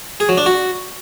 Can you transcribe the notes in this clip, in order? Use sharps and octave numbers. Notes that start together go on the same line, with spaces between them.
G#4
F#3
D4
F#4